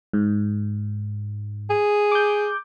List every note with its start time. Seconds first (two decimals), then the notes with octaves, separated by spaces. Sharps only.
0.13 G#2
1.70 G#4
2.12 D6 G6